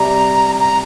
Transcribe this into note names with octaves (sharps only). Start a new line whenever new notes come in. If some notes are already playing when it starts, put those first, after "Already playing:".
Already playing: C3 G3 A#5
A#5